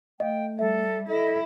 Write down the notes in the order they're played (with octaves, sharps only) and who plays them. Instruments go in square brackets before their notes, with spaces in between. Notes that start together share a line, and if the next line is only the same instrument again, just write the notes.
[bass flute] A3 [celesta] D#5 F5 [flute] G5
[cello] G3 [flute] A4 [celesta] E5
[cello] E4 [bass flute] A4 [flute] D#5